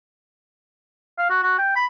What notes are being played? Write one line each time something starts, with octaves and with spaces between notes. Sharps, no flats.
F5
F#4
F#4
G5
B5